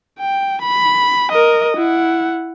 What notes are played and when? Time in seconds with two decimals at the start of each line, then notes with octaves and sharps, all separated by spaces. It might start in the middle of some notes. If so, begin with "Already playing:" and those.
0.19 G5
0.62 B5
1.32 A#4 D#5
1.77 E4 F#5